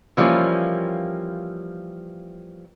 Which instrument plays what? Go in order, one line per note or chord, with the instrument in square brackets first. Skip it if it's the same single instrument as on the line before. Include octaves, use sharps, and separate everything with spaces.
[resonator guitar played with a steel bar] E3 F3 G3 A#3 C#4